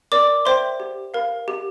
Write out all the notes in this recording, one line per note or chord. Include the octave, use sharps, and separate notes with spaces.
A#4 D5 D6
C5 E5 G5 C6
G4
A#4 F5
G4